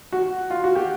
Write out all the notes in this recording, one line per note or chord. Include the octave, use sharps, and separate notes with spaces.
F#4
F4
F#4
G4